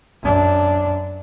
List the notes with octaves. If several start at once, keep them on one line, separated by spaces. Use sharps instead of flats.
F#2 D4